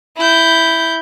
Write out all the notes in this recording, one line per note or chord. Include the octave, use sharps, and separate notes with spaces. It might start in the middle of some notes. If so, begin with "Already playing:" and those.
E4 G6